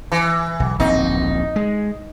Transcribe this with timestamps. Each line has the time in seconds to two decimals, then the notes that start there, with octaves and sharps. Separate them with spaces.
0.12 E3
0.60 B1
0.80 D1 A#1 C4 D#4
1.56 G#3